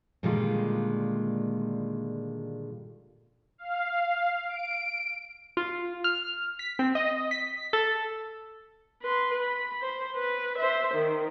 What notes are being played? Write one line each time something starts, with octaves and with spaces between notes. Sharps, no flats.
A#2 D3 D#3 G3 G#3 F4
F5
D7
F4
F6
B6
C4
D#5
B6
A4
B4 C6
B5
C5
B4
C5 E5
D#3